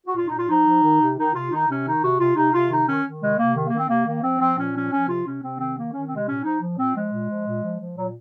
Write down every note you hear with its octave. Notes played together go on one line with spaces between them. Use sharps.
F#4
A#2 F4
D#4
A#2
F4
F3 D#4
F3
D#3
C3
D#3 D#4
C3 F4
D#3 D#4
C3 C#4
D#3 D#4
C3 F#4
C3 F4
C3 D#4
C3 F4
D#3 D#4
D#3 C#4
D#3
C3 G#3
C3 A#3
D#3
A#3
D#3
C4
C3 A#3
D#3 A#3
F3 C4
F3 C4
A#2 C#4
F3 C#4
F3 C#4
C3 F4
C3 C#4
C3 C4
D#3 C4
D#3 A#3
D#3 C#4
C3 C4
G#3
A#2 C#4
F3 D#4
F3
A#2 C4
F3 G#3
A#2
F3
A#2
F3
F3
A#2 F#3